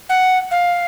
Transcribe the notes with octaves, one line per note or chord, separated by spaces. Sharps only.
F#5
F5